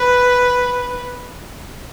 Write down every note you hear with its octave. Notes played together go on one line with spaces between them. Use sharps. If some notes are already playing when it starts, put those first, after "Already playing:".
Already playing: B4